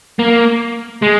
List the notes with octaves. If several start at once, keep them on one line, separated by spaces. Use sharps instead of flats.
A#3
G#3